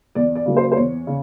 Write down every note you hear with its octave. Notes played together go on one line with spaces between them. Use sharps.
E2 D5
D5
C#3 F#3 A#3
C5
C5
E2 C#5
C#3